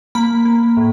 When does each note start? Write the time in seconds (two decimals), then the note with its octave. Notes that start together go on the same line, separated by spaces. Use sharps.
0.15 A#3 B5
0.45 A#3
0.77 A2